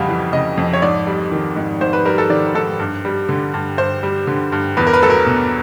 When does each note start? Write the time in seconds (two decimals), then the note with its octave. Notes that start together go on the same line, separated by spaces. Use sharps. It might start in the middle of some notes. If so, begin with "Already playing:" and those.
Already playing: F2 C#3 G3 F5 F#5 B5
0.09 E3
0.33 C#3 D#5
0.57 F2
0.73 C#5
0.82 G#2 D5
1.07 G3
1.32 D#3
1.56 G#2
1.81 G#2 C5
1.93 B4
2.05 G3 A#4
2.18 A4
2.30 D#3 D5
2.54 G#2 A4
2.79 G2
3.05 G3
3.29 D3
3.54 G2
3.78 G2 C5
4.03 G3
4.27 D3
4.52 G2
4.77 E2 B4
4.87 A#4
4.93 B4
5.02 F#3 A4
5.10 A#4
5.26 B2